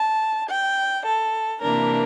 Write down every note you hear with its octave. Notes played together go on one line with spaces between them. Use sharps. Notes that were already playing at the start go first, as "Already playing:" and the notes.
Already playing: A5
G5
A4
C3 E3 A#3 D4 A#4